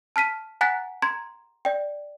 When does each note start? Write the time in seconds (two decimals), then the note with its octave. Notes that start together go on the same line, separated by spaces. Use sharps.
0.16 A5 F6 B6 D#7
0.61 F#5 G#5 A#5 F#6 A6 B6
1.02 A#5 C6 G#6
1.65 D5 G5